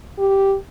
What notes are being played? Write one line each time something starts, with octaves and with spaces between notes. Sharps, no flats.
G4